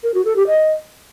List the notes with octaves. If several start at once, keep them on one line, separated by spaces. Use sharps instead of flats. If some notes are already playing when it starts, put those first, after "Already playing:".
A#4
F#4
A4
G4
D#5